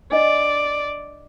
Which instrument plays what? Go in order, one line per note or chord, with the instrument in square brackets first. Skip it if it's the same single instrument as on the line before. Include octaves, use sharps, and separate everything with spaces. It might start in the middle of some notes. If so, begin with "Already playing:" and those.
[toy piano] D4 D#5 [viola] D5